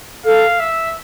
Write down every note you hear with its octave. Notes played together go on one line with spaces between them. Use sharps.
A4 F5
E5